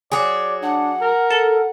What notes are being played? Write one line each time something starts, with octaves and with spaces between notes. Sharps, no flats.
F#3 G#4 D5
D4 F#5
A#4
A4